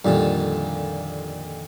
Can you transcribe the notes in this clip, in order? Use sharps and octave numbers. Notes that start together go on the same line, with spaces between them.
F2 A#2 D3 D#3 G3